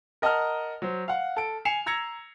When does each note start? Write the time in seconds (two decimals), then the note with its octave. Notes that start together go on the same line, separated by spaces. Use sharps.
0.22 A#4 D#5 F#5 A5 A#5 F6
0.82 F#3 C5
1.08 F5 F#5
1.37 A4 D7
1.65 G#5 C7 C#7 E7 F7
1.86 A#5 E6 G#6 A#6 C#7 F7